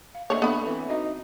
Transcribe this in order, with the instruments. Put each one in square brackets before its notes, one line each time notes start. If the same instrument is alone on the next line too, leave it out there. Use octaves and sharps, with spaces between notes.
[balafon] F5
[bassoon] D3 [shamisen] A3 C#5 [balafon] A#3 D#5 E5
[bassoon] A3 [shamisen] B3 B5 [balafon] D4 A4
[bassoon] E3 [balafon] C4
[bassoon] D#4 [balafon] F#4 D#5 E5